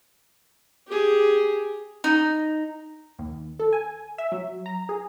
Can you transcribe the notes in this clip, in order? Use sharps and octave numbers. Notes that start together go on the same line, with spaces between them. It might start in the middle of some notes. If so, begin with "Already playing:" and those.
G4 G#4
D#4
D#2
A4
G#5
E5
F#3
A#5
G#4